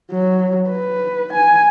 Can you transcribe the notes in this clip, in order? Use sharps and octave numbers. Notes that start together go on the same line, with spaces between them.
F#3
B4
G#5